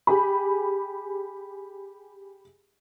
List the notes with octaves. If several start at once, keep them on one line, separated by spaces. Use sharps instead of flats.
G4 G#4 G#5 B5